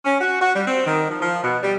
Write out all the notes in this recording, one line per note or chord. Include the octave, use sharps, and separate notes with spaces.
C#4
F#4
F#4
G3
C4
D#3
F3
F3
B2
G3